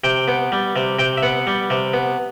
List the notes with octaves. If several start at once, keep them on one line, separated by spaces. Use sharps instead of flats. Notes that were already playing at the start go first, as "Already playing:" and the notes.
C3 G5
B3
G3
C3
C3 G5
E5
B3 F#5
G3
C3
B3